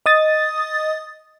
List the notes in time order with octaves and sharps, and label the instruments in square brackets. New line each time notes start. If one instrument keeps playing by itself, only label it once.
[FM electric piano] D#5 D#6 A6